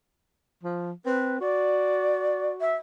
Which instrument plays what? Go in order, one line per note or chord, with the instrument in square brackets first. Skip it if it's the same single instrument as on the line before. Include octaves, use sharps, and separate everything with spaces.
[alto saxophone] F3
[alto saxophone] C4 [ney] B4
[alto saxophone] F#4 [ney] D5
[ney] E5